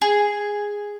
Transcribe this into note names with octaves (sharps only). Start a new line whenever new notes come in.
G#4